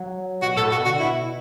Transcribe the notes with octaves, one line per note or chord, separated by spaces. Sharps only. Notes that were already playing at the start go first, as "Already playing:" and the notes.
Already playing: F#3
B2 F#4
A2 A4
B2 F#4
D3 F#4
B2 E4